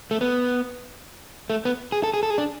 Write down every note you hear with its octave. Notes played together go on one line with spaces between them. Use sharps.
A3
B3
A3
B3
G#4
A4
G#4
A4
G#4
D4